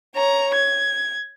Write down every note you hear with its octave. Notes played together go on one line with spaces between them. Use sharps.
C#5 A#5
G#6